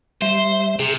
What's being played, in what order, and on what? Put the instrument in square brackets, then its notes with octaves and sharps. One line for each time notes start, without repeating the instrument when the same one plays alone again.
[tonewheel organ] G3 E5 [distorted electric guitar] C5
[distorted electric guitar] C3 [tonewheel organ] G#4